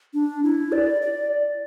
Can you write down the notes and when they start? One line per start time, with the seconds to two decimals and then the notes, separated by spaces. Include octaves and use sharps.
0.14 D4
0.43 E4
0.72 D5
1.02 D5